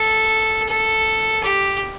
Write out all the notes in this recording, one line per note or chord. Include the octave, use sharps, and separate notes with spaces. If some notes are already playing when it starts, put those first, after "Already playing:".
Already playing: A4
A4
G4